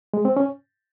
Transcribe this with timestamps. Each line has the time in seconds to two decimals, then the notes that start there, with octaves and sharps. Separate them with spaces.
0.14 G#3
0.25 C4
0.37 C#4